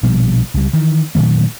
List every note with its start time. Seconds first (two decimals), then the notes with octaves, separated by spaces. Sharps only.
0.03 A#1 B2 F3 G3
0.54 C#2 G3
0.73 D#3 E3
1.15 A#2 D#3 F#3 A3